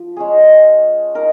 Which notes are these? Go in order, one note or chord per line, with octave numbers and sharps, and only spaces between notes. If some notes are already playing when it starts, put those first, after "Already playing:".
Already playing: F3
G#3 C#4 G#4
D#4 A#4 F5